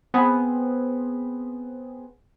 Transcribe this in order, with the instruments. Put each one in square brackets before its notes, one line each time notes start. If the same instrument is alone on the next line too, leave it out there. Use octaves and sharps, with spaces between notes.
[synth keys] B3 C4 G#4